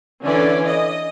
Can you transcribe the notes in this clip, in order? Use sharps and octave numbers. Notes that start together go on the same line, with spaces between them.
D3 E3 C#4 D5
D#5